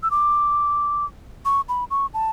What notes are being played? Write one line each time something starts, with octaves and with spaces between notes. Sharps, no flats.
E6
D6
C#6
B5
C#6
A5